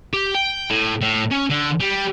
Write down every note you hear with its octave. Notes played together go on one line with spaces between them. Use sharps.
G4
G5
A2
A2
C#4
D3
G3